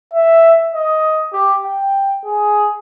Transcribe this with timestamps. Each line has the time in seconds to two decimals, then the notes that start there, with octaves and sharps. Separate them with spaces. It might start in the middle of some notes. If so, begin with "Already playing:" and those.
0.13 E5
0.74 D#5
1.33 G4
1.64 G5
2.25 G#4